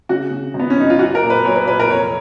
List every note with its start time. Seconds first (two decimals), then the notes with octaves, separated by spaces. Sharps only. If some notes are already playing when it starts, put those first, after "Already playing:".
0.09 C#3 F#4
0.31 C#3
0.54 G#1
0.59 B3
0.70 C#4
0.77 F#2 D#4
0.90 F4
0.99 B1 F#4
1.15 A#4
1.23 A#2
1.30 B4
1.45 B1 C#5
1.56 B4
1.67 A#2 B4
1.79 A#4
1.90 F1 C#5